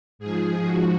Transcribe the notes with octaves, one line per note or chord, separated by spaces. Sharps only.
G#2 F3 G#4
F#4